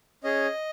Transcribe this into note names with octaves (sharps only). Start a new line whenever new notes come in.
C#4 G#4 D#5